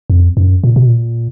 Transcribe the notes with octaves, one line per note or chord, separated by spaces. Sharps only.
F2
F#2
A#2
B2
A#2